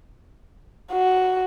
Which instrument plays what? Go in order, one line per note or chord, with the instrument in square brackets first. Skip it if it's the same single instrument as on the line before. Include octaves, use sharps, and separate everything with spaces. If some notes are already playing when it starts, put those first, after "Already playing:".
[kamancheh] F#4